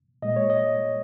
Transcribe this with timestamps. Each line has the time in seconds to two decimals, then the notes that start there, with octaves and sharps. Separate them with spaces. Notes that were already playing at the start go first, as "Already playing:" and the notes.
0.22 A#2 G#3 D#5
0.36 C#5
0.50 D#5